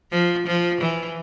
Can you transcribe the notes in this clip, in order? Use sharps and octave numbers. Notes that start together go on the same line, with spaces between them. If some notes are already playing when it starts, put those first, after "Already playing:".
F3
F3
E3